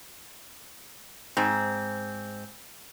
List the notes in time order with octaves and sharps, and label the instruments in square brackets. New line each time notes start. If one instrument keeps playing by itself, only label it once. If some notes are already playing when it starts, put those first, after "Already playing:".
[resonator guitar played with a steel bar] G#2 C4